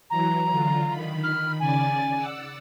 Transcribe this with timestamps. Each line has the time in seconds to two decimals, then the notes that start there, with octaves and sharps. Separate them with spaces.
0.10 E3 F#3 A#5
0.51 D3 F4
0.89 D#3 B5
1.24 F6
1.60 C#3 D5 G#5 A6
2.14 D5 F#5 E6